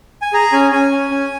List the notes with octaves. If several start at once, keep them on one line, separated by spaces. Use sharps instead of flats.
G#5
G#4 A#5
C#4 G#5
C#4 G#5
C#4
C#4